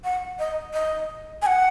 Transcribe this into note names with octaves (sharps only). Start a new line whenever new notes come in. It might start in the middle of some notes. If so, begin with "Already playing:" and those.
F#5
D#5
D#5
G#5
F#5